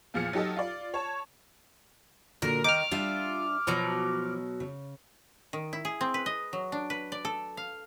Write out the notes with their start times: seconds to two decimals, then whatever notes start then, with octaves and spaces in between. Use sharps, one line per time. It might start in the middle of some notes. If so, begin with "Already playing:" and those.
0.14 E2 A#2 F3 G#4 F6 C#7
0.33 F#3 D#4 G4 A4 D#5
0.56 F4 D5
0.94 C#5 A5
2.42 A#2 D3 F#3 A#4
2.64 D#3 D#5 D6 F6
2.92 G3 D4 F4 E5
3.67 B2 F3 F#3 A#5
4.60 C#3
5.53 D#3
5.73 E4
5.85 G#4
6.01 C4
6.14 B4
6.26 D#5
6.53 F#3
6.72 D4
6.90 B4
7.12 D5
7.25 A4
7.57 F5